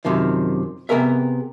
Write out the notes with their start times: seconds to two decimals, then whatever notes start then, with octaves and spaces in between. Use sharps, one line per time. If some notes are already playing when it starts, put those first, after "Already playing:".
0.05 F#2 C3 D#3 F3
0.89 C3 B3 G#4 A#4 E5